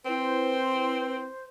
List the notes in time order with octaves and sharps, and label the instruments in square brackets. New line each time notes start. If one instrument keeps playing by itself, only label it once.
[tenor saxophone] C4 [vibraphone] E4 B4 [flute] C5